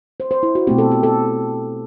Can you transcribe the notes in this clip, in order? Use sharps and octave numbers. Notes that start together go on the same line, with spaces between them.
C5
C5
E4
F#4
B2 A3 C4 G4
A4
G4
A4